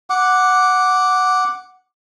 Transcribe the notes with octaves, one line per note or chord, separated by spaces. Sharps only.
F#5 D6